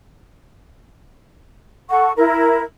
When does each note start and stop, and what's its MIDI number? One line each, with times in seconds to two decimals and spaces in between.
1.89 2.12 69
1.89 2.12 78
1.89 2.12 85
2.16 2.62 64
2.16 2.62 70